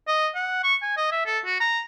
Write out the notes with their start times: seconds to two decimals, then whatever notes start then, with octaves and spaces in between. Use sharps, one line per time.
0.08 D#5
0.35 F#5
0.63 C#6
0.82 G#5
0.97 D#5
1.12 E5
1.26 A4
1.45 F#4
1.60 A#5